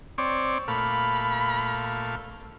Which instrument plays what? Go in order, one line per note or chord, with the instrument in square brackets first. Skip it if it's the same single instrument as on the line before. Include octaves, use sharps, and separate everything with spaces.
[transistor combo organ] C4 C#5 D5
[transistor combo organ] A#2 A3 F5 [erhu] B5